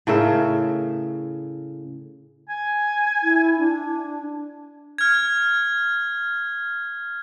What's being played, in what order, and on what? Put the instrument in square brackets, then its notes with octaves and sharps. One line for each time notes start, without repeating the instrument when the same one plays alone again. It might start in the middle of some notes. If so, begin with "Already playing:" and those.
[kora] A2 C#3 A#4 E5
[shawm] G#5
[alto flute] E4
D4
[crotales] F6 G#6